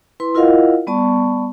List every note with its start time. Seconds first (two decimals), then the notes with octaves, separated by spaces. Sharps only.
0.20 E4 B4 C6
0.35 E4 F4 A#4 D#5 F5 F#5
0.87 G3 B3 D5 A5 C#6